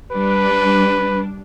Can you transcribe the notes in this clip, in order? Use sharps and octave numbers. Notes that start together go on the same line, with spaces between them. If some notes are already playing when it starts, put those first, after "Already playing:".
G3 D4 B4